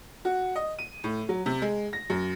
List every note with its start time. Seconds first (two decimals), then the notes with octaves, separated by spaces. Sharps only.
0.25 F#4
0.56 D#5
0.79 D#7
1.04 A2
1.29 F#3
1.46 C3
1.62 G#3
1.93 A#6
2.10 F#2